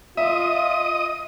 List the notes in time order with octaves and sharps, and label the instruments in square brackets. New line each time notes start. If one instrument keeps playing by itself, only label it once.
[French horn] F4 [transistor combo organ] D#5 D#6 [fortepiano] E5